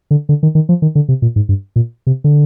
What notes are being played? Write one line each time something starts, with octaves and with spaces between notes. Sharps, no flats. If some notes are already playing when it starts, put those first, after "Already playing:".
D3
D3
D#3
D#3
F3
D#3
D3
C3
A#2
G#2
G2
A#2
C3
D3